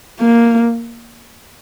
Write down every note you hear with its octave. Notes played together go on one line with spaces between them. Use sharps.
A#3